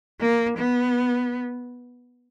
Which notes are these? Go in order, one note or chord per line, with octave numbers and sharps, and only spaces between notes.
A#3
B3